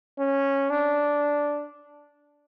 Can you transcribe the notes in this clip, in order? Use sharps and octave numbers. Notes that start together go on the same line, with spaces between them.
C#4
D4